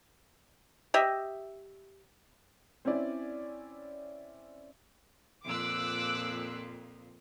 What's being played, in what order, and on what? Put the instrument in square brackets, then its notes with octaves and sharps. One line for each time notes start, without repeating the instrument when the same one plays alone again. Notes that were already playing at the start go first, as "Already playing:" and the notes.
[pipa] G4 D#5 E5
[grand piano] C4 C#4 E4 D5
[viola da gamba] F2 A#2 F3 [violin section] D6 E6 F#6